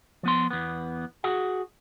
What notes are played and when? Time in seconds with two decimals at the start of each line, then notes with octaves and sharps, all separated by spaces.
0.23 F3 B3 C6
0.50 E2 B3
1.24 F#4 G#4 F#5